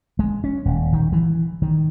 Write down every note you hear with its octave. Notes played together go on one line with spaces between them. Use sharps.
G#3
C#4
D#1
D#3
E3
D#3